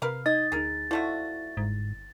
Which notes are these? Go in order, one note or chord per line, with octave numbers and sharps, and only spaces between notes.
C3 A#4 B4 F5
D#4 D#5 G#6 A6
D2 D#4 G#4 A#4
F3 A3 E4 F#4 D5
G1 G#2